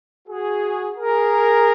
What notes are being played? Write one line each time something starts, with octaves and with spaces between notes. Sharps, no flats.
F#4 G#4
G#4 A#4